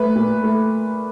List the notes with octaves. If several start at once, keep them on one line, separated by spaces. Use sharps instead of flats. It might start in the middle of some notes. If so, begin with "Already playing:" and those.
Already playing: A3 B4
A#2
A3